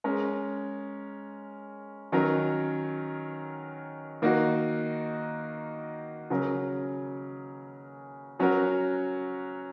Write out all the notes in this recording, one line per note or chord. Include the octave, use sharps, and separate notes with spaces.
G#3 C#4 A#4
D#3 F#3 C#4 A#4
D#3 A#3 D#4 F#4
C#3 F#3 C#4 A#4
F#3 C#4 F#4 A#4